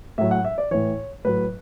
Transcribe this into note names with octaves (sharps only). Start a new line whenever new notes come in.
A2 F#3 E5
F#5
E5
D5
A2 E3 C#5
A2 F#3 B4